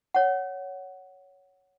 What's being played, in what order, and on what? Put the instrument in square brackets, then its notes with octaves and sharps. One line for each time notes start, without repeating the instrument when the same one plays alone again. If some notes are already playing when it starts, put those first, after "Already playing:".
[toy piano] C#5 F#5